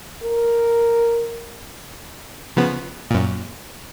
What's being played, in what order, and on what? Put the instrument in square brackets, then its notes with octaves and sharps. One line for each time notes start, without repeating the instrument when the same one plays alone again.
[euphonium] A#4
[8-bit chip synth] C#3 F3 B3
F#2 A#2